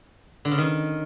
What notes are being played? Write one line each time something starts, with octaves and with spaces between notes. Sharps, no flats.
D3
C#3
D#3